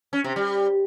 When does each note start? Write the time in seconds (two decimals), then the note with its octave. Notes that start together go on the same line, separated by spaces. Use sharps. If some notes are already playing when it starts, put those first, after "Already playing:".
0.13 C#4
0.24 C3
0.36 G3